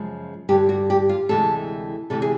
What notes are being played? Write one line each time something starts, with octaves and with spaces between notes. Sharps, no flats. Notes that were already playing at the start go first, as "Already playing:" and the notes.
Already playing: F#2 C#3 F3 G#3
G2 D3 G3 G4
F#4
G4
F4
D2 C3 E3 G#3 A4
D2 C3 E3 A4
G#4